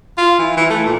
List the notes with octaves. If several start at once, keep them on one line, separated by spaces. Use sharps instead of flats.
F4
E3
E3
A3
A#2